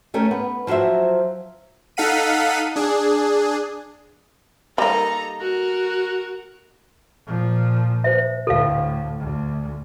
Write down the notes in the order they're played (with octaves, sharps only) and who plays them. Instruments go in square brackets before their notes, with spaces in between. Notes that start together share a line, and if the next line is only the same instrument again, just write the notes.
[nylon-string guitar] A3 C#4 G4 A#4
B3
F3 F#3 F#4 C5 E5
[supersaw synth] D#4 A4 F5 F#5 B6 D#7
D4 G#4
[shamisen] G3 A#3 [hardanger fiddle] D#4 A4 [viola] A#5
[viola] F#4 [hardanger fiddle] A#4
[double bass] A#2 F3
[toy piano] C5 E5
[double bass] D2 A2 [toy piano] A4 F5
[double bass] D2